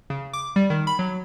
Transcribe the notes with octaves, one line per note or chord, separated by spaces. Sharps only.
C#3
D6
G3
D#3
B5
F#3